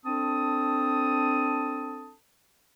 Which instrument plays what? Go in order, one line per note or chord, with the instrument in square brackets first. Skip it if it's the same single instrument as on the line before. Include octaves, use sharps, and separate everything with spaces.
[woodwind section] C4 D4 A4 A5 D#6